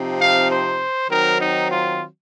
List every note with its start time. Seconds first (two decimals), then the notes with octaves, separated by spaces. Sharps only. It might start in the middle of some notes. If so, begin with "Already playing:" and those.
Already playing: C3 F3 C4 D#4
0.18 F5
0.49 C5
1.09 D#3 F#3 C4 D#4 A#4
1.39 D#4
1.70 F4